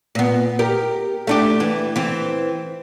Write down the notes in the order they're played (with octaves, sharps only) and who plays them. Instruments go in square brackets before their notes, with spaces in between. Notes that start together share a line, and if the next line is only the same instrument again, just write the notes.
[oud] A#2 B3
G4 A#4
A3 D4 G4
E3
E3 C4